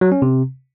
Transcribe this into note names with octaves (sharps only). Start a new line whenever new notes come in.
F#3
C#4
C3